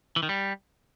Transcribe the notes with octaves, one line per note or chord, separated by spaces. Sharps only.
E3
D#3
G3